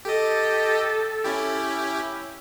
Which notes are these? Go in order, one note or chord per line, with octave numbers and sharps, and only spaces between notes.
G4 A4 D#5
C#4 E4 G4